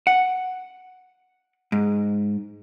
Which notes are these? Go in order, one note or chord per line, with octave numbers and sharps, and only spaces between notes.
F#5
G#2